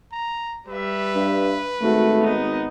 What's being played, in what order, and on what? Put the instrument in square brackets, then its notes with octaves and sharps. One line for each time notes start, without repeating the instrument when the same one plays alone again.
[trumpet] A#5
[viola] G3 E5 [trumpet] B4
[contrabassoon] G2
[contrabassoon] G#1 [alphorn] A3 [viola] F#4
[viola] B3 D#4